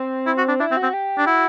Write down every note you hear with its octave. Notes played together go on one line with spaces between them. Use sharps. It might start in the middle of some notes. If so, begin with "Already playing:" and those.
Already playing: C4
E4
F#4
D4
D4 E4
C4
F#4
C4
G4
D4
E4 F#4